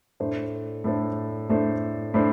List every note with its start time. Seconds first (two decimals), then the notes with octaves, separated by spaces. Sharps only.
0.20 A2 A3 D4 A4 C5
0.84 A2 A3 D4 A4 C5
1.49 A2 A3 D4 A4 C5
2.14 A2 A3 D4 A4 C5